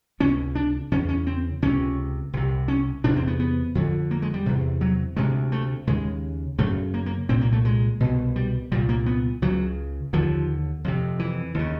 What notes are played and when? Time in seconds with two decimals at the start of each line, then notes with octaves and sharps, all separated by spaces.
0.20 C#2 C3 C#4
0.55 D4
0.92 E2 C#3 C#4
1.09 C#4
1.27 C4
1.62 C#2 C3 C#4
2.33 C2 C3
2.68 C#4
3.04 E2 C3 D4
3.16 C4
3.28 B3
3.40 B3
3.75 F2 D3
4.11 A#3
4.22 G#3
4.34 G3
4.46 E2 C3
4.81 F#3
5.17 D2 C3 G#3
5.52 A3
5.87 D#2 C#3 G#3
6.58 F#2 C#3 A3
6.94 A#3
7.06 A#3
7.29 C2 A#2 C4
7.41 A#3
7.52 A3
7.65 G#3
8.00 C2 B2
8.36 G3
8.72 C2 A#2 G3
8.89 A#3
9.06 B3
9.42 C#2 C#3 F#3
10.13 D#2 D3 F3
10.84 F2 C3
11.19 E3
11.54 D#2 C#3